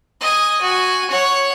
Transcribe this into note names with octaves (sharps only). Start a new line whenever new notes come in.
D#5 G#5
F#4 G#5
C#5 F#5